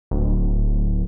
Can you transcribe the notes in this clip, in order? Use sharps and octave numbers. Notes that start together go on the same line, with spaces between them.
D1